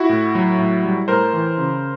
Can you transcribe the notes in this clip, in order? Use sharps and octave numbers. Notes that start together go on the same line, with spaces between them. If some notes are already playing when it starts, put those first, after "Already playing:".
Already playing: E4 F#4
A2
F#3
A2
G3
A2 A#4 C5
E3
C#3